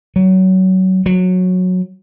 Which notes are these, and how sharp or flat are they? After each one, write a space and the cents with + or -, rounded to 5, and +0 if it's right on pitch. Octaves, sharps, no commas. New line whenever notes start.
F#3 +20
F#3 -15